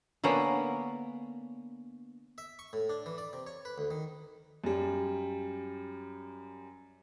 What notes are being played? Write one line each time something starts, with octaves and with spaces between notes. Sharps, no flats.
D3 A#3 B3 C#4
E5
C#6
A2
D4
E3
D5
C3
C#5
B4
D2
D#3
F#2 G3